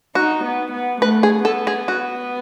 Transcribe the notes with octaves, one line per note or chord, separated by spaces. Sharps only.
D#4 F#4
B3
B3
A3 B4
G#4
B3 A4
G#4
F#4